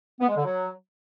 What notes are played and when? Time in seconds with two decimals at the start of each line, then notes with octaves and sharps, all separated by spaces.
0.20 B3
0.28 G#3
0.36 D3
0.45 F#3